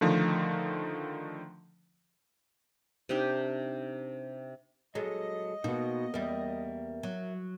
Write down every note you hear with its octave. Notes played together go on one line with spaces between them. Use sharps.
D3 D#3 F3 A3
C3 D4 D#4 G4
F#3 G#3 A4 D#5
B2 A#3 B3 D#4 F#4
E2 G3 A#4 E5
F#3